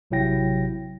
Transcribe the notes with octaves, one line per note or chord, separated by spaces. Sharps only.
A1 C3 F#3 E4 G5 A#6